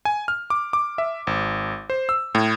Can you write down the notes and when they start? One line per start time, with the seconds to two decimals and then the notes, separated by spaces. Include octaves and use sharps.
0.05 G#5
0.28 F6
0.50 D6
0.73 D6
0.98 E5
1.27 G#1
1.90 C5
2.09 E6
2.35 A2